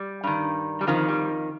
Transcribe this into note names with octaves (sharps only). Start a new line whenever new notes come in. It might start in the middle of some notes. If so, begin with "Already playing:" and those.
Already playing: G3
G2 D#3
G3
F2 D#3 F3
G3